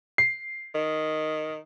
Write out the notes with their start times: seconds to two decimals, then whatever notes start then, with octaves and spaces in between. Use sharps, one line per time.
0.18 C7
0.75 D#3